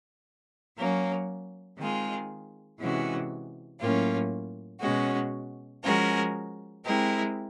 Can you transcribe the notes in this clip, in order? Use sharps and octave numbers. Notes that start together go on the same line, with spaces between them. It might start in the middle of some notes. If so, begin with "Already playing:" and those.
F#3 A#3 C#4
D#3 G#3 C4 F4 G#4
C3 E3 G#3 C#4 F#4
A2 F#3 A#3 C#4 F4
B2 G#3 C#4 F#4
F3 G#3 C#4 F#4 A#4
G#3 C4 E4 G4 A#4